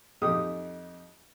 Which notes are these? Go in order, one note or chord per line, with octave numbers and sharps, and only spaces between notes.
F2 D#4 G4 D#6